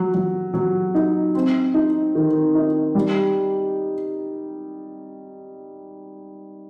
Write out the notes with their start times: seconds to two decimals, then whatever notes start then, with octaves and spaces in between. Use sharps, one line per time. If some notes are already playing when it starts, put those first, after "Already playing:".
Already playing: F#3
0.14 F#3
0.54 F#3
0.95 D#4
1.35 C4
1.74 D#4
2.15 D#3
2.55 D#4
2.95 G3